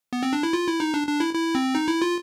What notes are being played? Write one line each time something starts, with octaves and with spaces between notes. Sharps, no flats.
B3
C4
D4
E4
F4
E4
D#4
D4
D4
E4
E4
C4
D#4
E4
F4